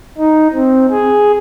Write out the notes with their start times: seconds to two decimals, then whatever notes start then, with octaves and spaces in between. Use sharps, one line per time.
0.18 D#4
0.53 C4
0.91 G#4